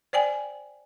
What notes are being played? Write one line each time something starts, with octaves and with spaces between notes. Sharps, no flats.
C5 D5 G5 G#5